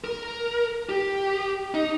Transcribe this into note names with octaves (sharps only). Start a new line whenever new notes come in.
A#4
G4
D#4